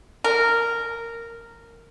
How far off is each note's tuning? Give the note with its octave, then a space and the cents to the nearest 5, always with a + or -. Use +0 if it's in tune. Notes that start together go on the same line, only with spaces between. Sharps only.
A#4 -10